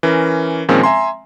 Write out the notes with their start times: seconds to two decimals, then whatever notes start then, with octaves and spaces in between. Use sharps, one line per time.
0.03 E3 C#4 A#4
0.69 A#2 D#3 F3 G#3 C4 C#4
0.83 E5 G#5 A#5 C6